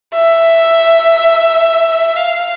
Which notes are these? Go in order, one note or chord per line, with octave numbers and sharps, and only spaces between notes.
E5
F5